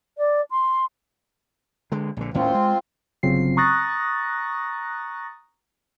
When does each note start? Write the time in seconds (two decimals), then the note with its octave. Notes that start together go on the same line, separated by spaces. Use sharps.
0.17 D5
0.50 C6
1.92 D3 G#3
2.17 A#1 D3
2.34 D#1 A2 C4 C#4 F4
2.54 G#3
3.23 G1 C#3 F#3 C4 F4 C7
3.57 A#5 C#6 D#6 F#6 A6 A#6